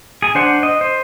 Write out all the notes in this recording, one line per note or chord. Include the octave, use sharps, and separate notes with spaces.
G#4 G#5
D4 C5 F#5
D#5
C5